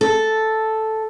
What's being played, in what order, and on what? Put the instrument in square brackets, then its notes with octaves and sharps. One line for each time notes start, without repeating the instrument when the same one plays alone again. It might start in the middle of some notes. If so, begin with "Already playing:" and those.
[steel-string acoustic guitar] A4